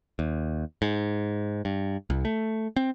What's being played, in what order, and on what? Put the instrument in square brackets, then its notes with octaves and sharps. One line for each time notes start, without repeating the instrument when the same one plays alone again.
[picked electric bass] D#2
G#2
G2
C2
A3
C4